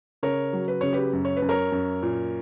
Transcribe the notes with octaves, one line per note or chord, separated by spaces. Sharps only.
C#3 A#4 C#5
F#3
B4
C#3 C#5
G4 B4
F#2
C#5
B4
F#2
A#4 C#5
F#2
A#2